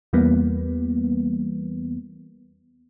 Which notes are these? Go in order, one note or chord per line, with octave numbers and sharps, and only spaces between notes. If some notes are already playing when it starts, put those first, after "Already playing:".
E2 E3 G3 A#3 B3